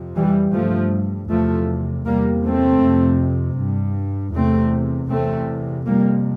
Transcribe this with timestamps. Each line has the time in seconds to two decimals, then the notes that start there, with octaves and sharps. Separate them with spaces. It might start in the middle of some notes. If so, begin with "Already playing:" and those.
Already playing: F2 C3
0.16 E3 G3
0.54 G2 F3 A3
1.30 E2 C3 F3 A3
2.06 E2 C3 G3 A#3
2.44 A3 C4
2.83 F2 C3
3.58 G2
4.35 E2 C3 A3 C4
5.10 E2 C3 A3 C4
5.87 F2 C3 G3 A#3